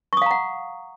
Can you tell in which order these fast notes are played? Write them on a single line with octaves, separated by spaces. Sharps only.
C#6 D#6 F5 A#5 F#5